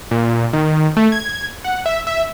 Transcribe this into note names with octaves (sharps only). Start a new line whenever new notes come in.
A#2
D#3
A3
G#6
F#5
E5
E5